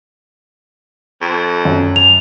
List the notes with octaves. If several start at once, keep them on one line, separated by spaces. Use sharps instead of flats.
F2
F#2
F7